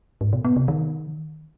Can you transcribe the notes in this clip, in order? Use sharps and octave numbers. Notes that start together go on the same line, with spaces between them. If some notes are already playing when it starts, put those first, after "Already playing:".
G#2
B2
B3
C3
D#3